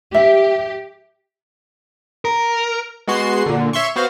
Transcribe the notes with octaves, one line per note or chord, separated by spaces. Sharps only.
G4 E5
A#4
G#3 B3 F#4 C6 C7
A#2 D3
C#5 E5 C6 C#6
B3 F#4 C5 F5